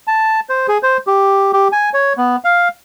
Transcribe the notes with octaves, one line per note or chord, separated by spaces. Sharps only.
A5
C5
G#4
C5
G4
G4
G#5
C#5
B3
F5